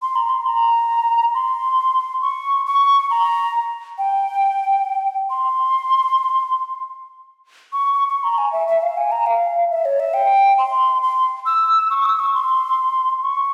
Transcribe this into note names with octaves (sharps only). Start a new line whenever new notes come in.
C6
A#5
C6
A#5
C6
C#6
C#6
A#5
G5
C6
C#6
C#6
C#6
A#5
G#5
E5
E5
F5
G#5
A#5
F5
E5
C#5
E5
G5
C6
C6
E6
C#6
E6
C#6
C6
C#6